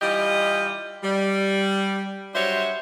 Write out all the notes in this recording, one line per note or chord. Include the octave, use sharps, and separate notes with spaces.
E3 G3 F4 G4 D#5
G3
F#3 G3 D4 C5 C#5 E5